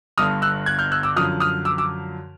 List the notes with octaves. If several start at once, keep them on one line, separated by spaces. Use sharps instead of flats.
G1 G2 D3 D#6 F6
E6 F#6
F#6 G#6
F6 G6
E6 F#6
D6 E6
F#2 D3 F3 D#6 F6
D#6 F6
D6 E6
D6 E6